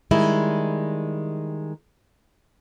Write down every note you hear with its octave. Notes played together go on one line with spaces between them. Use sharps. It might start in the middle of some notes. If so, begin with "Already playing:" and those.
D#3 G3 G#3 E4